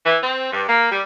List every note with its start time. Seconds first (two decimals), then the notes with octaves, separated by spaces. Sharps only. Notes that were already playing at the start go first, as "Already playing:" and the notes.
0.06 E3
0.22 C4
0.52 G2
0.68 A#3
0.91 G3